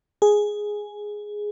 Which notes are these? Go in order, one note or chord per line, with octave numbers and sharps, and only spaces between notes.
G#4